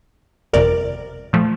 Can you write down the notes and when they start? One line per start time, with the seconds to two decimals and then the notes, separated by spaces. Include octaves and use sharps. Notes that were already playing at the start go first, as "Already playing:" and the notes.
0.53 G1 F2 C3 A#4 D5
1.33 A#2 F3 A3